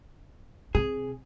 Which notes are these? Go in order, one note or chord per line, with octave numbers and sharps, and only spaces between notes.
C3 G#4